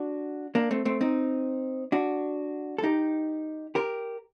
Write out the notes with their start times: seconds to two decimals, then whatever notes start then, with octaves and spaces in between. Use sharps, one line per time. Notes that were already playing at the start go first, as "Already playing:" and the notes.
Already playing: D4 F#4
0.55 A#3 D4
0.71 A3 C4
0.85 A3 C4
1.01 C4 D#4
1.92 D4 F#4
2.78 A4
2.84 D#4 G4
3.75 G4 A#4